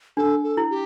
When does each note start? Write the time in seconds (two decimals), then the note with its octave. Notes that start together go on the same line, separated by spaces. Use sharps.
0.17 D4 A4
0.44 A4
0.57 E4
0.71 G4